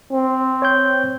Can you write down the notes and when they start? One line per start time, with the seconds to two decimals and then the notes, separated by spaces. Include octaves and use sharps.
0.13 C4
0.62 C#5 G5 G6